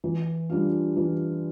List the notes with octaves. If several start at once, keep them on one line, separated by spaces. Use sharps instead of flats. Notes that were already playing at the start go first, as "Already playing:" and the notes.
E3
G3 D4 F4
E3